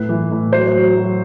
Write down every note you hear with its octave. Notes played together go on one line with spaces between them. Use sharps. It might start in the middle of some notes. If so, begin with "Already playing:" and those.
Already playing: A2 B4
E3
A2
F#3 C5
F#3
F#3